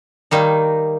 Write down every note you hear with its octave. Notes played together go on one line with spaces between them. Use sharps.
D#3 G3 A#3 D#4